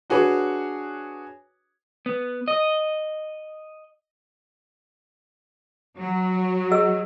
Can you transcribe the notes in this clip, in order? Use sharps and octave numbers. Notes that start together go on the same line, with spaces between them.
D4 F#4 G#4 B4 C#5
B3
D#5
F#3
G#4 D#5 E6